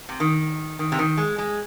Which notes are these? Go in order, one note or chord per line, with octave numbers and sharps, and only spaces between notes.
C3
D#3
D#3
C3
D#3
G#3
G#3